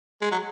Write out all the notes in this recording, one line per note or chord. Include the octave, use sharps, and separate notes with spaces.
G#3
F#3